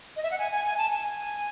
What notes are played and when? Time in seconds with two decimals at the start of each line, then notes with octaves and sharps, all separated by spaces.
0.17 D#5
0.23 E5
0.31 F#5
0.39 G#5
0.51 G#5
0.65 G#5
0.77 A5
0.91 G#5